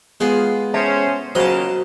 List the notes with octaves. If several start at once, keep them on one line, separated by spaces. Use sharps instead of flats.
G#3 B3 F4 G#4
C#4 A4 C5 E5 A5
C#3 F#3 A#3 F4 C5 D#5 A5